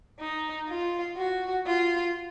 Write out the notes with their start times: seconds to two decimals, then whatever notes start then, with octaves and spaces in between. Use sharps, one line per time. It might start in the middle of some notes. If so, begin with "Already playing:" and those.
0.20 D#4
0.69 F4
1.17 F#4
1.66 F4